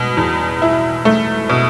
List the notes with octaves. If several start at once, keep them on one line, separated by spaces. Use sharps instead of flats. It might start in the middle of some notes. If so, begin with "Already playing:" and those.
Already playing: B2
E2
E4
A3
B2